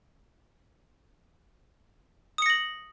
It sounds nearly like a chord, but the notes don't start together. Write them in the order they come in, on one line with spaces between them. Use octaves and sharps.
D#6 C#7 A#6 F#7